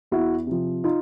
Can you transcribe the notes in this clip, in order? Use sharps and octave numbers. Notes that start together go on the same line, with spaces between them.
E2 E4 F#4
C3 F3
D#4 F4